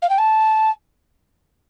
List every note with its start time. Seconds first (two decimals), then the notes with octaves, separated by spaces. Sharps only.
0.02 F5
0.09 G5
0.18 A5